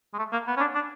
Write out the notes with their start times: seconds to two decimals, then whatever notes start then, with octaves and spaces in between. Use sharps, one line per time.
0.14 G#3
0.18 A3
0.33 A#3
0.47 B3
0.57 C#4
0.60 D4
0.75 D4